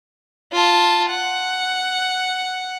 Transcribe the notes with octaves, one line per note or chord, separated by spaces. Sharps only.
F4 A5
F#5